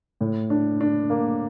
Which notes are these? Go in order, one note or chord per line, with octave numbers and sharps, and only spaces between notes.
A2
D4
D4
A#3